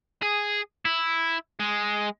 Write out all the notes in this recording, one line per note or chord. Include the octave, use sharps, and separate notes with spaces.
G#4
E4
G#3